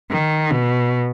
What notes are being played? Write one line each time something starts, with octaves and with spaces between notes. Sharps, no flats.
D#3
B2